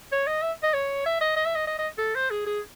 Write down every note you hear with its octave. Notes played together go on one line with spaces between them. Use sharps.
C#5
D#5
E5
D#5
C#5
E5
D#5
D#5
E5
D#5
D#5
D#5
A4
C5
G#4
G#4